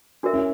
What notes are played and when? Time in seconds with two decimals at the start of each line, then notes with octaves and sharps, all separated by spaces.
0.23 D4 F#4 A#4 E5
0.34 C#4 E4